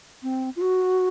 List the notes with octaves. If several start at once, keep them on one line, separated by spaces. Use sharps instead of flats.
C4
F4
F#4